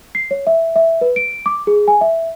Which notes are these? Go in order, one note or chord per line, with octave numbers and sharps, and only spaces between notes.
C7
C#5
E5
E5
B4
D7
D6
G#4
G#5
E5